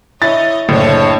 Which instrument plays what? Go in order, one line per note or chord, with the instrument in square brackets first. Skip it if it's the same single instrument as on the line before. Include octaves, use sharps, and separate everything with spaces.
[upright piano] E4 A6 [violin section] C#5 D#5
[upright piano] F#1 [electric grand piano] A2 [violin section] D4 C#5 A5